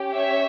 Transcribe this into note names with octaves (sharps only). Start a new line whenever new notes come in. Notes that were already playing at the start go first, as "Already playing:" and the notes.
Already playing: C#4 G4
C#5 E5